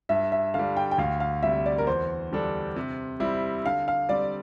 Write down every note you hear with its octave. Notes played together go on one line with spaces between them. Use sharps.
G2 E5
E5
D3 F5
G3
G5
G5
D2 F5
F5
C3 G3 E5
D5
A#4
E2 C5
D3 G3 D4 A4
C3
G3 C4 E4
D3 F5
F5
G3 C4 D5